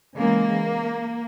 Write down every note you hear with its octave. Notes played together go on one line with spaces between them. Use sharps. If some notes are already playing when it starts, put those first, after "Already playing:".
C#3 E3 G#3 A#3